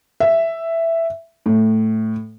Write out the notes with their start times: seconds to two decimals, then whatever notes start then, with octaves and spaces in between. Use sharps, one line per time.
0.20 E5
1.46 A2